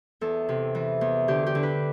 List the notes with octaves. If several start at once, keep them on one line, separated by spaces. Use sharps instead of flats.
E2 A4
C3
E3
E2
D3 G4
G4
D3
B4